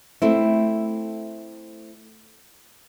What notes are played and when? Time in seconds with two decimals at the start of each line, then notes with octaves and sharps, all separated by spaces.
0.22 A3 C4 E4